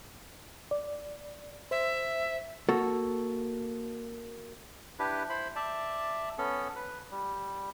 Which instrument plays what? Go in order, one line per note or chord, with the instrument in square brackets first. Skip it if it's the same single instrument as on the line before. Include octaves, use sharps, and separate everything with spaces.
[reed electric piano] D5
[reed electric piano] C5 [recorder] E5
[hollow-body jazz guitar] A#3 F#4 A4
[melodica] D4 E4 G4 B4
E4 C5 B5
D5 E5 A5
B3 C#4 A4
B4
G3